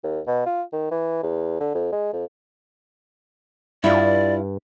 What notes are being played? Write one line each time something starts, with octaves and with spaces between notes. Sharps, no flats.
D#2
B2
F4
D#3
E3
E2
D3
F2
G#3
F2
G2 E4 F4 D5